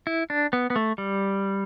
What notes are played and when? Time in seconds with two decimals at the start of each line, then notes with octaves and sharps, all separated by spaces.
0.07 E4
0.30 D4
0.53 B3
0.70 B3
0.76 A3
0.98 G3